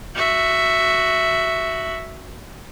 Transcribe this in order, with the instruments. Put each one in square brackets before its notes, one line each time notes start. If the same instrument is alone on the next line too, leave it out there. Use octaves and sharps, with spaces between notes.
[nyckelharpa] F#4 E5